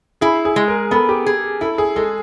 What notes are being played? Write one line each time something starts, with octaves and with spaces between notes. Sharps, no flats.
E4 G#4
G#4
G#3
A#4
B3 A4
G4
G#4
E4 A4
G#4
G#3 A4